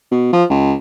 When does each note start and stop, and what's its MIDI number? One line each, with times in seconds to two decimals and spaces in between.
0.11 0.32 47
0.33 0.44 53
0.50 0.74 37